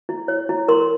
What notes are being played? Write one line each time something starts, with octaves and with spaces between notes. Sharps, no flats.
E4
C#5
E4
A#4 C6